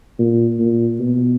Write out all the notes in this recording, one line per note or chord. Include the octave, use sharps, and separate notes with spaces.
A#2
A#2
B2